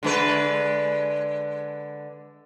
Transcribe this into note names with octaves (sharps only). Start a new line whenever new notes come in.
D3 G#3 B4